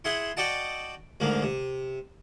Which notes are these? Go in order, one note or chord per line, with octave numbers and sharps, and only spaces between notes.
E4 G#4 E5 F#5 G#5 C6
F#4 D5 D#5 F#5 G5 A5
D2 G#2 F3 A#3
C3